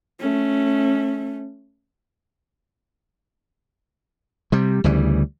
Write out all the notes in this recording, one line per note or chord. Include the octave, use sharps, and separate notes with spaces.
A3 C#4
C3 G3
D2 C#3 E3 G3